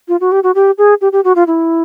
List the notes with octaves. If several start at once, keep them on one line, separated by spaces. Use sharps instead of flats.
F4
F#4
G4
F#4
G4
G#4
G4
G4
F#4
F4
E4